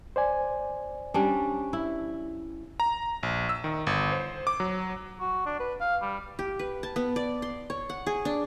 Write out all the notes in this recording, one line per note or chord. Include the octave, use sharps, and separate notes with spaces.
C5 D5 G#5
G3 C#4 D4
E4
A#5
A#1
E6
D#3
G1
C5
D6
F#3
F#4
D4
B4
F5
G3
G4
B4
A5
B3
D5
C6
C#5
F#5
G#4
D4